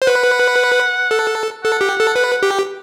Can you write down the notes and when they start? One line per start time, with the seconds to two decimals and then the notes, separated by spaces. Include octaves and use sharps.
0.02 C5
0.06 B4 F#5
1.11 A4
1.64 A4 F#5
1.81 G4
1.99 A4
2.16 B4
2.43 G4